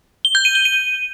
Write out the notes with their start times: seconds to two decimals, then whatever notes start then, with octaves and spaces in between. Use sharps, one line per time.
0.25 G7
0.35 G6
0.45 D#7
0.55 G7
0.65 D#7